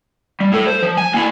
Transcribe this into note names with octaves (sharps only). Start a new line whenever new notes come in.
G3
A2 A4
C5
F3
G#5
A#3 E4